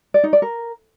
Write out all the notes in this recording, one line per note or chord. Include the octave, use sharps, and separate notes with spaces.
D5
D#4
D5
A#4